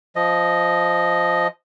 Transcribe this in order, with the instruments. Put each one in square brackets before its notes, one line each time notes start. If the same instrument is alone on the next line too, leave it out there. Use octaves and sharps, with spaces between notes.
[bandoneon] F3 D#5